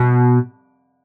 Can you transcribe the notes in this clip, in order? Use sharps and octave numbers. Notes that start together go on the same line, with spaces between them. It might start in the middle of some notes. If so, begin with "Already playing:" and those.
Already playing: B2